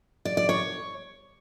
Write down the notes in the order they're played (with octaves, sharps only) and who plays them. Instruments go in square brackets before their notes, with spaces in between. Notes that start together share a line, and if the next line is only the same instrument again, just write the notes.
[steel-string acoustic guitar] D5
D5
C#5